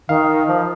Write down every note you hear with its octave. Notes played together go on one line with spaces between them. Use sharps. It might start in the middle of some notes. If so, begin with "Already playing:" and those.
D#3 F5
F3